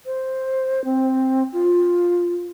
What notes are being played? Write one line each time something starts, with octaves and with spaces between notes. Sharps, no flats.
C5
C4
F4